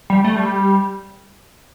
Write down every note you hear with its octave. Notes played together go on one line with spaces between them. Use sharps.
G3
A3
G3